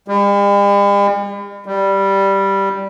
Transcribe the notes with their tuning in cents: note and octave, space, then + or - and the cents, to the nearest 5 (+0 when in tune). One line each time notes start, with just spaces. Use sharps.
G3 +45
G3 -5